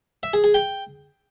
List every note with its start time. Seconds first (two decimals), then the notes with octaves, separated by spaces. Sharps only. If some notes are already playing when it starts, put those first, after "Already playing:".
0.23 E5
0.34 G#4
0.44 G#4
0.54 G5